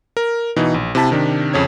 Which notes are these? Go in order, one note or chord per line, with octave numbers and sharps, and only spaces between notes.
A#4
B2 E3 D#4
A#1
C3 E4 A5 B6
C3 D#3 D4
F2 C#3 C#5 G#6